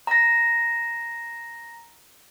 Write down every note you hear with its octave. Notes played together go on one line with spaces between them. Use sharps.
A#5 A#6